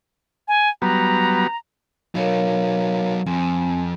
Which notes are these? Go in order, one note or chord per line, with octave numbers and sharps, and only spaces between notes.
G#5
F#3 G3 B3 A#5
F#3 D#4 A#4 C#5 F5
F2 C4 G#5